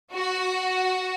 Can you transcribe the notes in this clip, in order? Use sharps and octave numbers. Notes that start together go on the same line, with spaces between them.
F#4